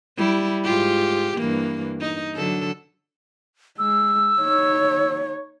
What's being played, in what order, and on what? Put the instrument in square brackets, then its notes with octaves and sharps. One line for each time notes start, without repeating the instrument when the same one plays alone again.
[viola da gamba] G3 E4
G#2 F4 G4
G2 E3 A#3
D#4
D3 F#3 A4
[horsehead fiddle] G#3 [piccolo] E6
[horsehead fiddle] D#4 C#5